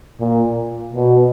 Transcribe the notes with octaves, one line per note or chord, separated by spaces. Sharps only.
A#2
B2